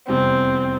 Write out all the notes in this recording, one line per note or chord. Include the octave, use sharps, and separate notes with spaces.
F1 E2 C3 G3 C4